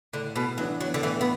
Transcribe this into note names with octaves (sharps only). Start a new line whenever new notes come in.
A2 D3
B2
E3 F#3 B3 D4
F#3
D3
A2 E3
B3